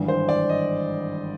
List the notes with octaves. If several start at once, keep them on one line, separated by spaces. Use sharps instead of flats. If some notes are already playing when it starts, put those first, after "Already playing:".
Already playing: G#1 G2 E3
C5
D5
D#5